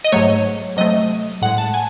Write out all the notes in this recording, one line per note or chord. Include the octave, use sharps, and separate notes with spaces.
D#5
G#2 F#3 A3 C#5
C3 F#3 A3 D#5
A2 G#3 F#5
A5
G#5